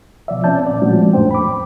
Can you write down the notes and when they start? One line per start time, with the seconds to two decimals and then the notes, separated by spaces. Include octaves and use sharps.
0.28 B2 F3 D5 E5
0.44 C4 C#4 D5 A5 G6
0.67 A#2 D5
0.82 F3 G#3 A3 C4 C#4 F#4
1.13 F2 A2 A3 D4 C5 G5
1.31 B5 D6